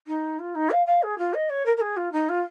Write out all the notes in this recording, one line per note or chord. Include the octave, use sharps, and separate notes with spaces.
D#4
F4
D#4
F5
F5
G#4
F4
D#5
C#5
A#4
A#4
G#4
F4
D#4
F4